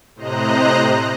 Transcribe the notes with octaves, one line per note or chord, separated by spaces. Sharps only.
A2 C3 C5 D#5 A#5 F#6